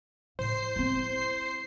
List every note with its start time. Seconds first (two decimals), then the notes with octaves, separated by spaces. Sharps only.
0.39 A2 C5 C7
0.76 C4 E4